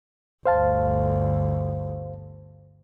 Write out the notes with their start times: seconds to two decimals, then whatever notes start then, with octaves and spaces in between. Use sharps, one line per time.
0.46 G1 D2 C5 F5 A5